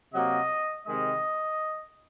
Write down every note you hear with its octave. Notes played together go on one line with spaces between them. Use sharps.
C3 F#3 A#3 D#5
C3 D#3 G#3 D#5